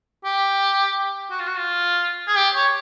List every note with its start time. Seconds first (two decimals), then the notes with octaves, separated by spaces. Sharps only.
0.25 G4
1.31 F#4
1.39 F4
1.47 F#4
1.57 F4
2.28 G#4
2.37 G4
2.54 C#5